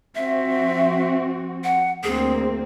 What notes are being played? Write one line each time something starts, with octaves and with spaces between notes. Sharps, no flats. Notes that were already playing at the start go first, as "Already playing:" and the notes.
F3 C4 F#4 E5
F#5
D2 A#3 C4 G#4